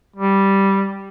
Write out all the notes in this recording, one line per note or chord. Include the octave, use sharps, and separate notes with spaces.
G3